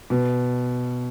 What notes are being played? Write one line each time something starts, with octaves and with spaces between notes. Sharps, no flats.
B2